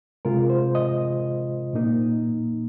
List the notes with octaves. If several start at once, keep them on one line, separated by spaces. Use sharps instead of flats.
C3 G#3 F4 A#4
C5
D#5
A#2 A#3 D#4